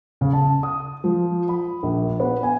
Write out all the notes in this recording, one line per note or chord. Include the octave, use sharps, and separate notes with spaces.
C#3
A5
D#6
F3
B5
A#1
B3
G#5